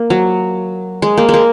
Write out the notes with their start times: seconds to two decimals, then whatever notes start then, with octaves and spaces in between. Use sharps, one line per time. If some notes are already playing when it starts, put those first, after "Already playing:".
Already playing: A#3
0.10 F#3
1.02 G#3
1.17 A#3
1.29 G#3
1.34 A#3